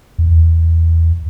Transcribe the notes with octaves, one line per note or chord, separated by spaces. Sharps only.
E2